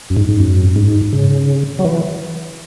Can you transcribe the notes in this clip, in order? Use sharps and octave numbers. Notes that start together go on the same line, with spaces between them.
F#2
G#2
G#2
F#2
G#2
C#3
F#3
E3